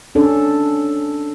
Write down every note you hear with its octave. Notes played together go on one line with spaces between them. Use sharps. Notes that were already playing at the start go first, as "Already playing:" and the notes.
C#4 D4 A4